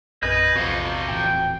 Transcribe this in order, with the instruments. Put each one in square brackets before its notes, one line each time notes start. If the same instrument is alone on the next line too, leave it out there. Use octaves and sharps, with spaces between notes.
[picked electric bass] A#1 F#2 C4 [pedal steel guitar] G#4 D#5 G6 [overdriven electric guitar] B4
[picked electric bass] A#1 E2 [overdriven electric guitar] C3 F3 [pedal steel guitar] F#4 C5 F5
[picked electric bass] D#1 A2 E3 [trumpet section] G5